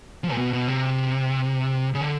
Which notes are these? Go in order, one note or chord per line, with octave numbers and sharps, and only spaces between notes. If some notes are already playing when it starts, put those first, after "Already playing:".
F3
A#2
B2
B2
C3
C#3
D3